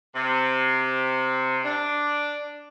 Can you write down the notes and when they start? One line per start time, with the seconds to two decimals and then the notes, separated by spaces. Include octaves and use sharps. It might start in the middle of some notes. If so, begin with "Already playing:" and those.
0.15 C3
1.65 D4